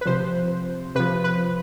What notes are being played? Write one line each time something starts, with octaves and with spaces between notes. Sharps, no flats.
B4
C3 F3 C5
C3 F3 B4
B4